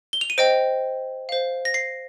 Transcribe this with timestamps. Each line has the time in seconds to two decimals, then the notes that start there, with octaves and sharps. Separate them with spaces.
0.13 G7
0.21 F7
0.30 D#7
0.38 C5 D#5 G5 D7
1.29 C5 F5
1.65 A#6
1.74 C7